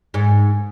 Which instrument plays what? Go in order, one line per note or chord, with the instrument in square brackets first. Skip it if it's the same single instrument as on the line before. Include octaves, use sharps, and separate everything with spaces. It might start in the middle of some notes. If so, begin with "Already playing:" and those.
[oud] G#2